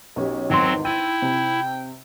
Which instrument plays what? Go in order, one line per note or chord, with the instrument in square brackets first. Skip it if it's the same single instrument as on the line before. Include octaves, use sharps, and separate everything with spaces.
[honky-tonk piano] B1 C#4 G4
[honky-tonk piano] G#1 E2 G#2 [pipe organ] F#3 C4 [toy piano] D#4 C6
[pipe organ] E4 [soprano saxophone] G5 [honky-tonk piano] E6 A6 D#7
[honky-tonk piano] C3